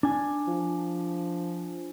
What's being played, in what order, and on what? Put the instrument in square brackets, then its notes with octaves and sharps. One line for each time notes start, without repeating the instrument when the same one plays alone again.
[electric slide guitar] D4 G#5
[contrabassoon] F3